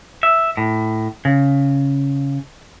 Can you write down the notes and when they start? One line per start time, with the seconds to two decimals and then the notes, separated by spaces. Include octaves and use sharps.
0.23 E5
0.57 A2
1.25 C#3